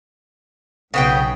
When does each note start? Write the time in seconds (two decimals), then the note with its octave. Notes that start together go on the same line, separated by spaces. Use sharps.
0.94 B1 C#3 B3 G5